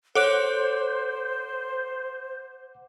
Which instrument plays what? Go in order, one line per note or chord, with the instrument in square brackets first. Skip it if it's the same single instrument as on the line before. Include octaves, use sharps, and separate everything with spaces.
[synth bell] A4 C#5 F#6 [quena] C5 [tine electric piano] F#5 D6